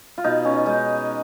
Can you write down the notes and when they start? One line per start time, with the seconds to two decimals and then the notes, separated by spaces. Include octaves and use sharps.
0.18 F4
0.24 B2 D#4
0.45 C#4
0.66 G#3 D#4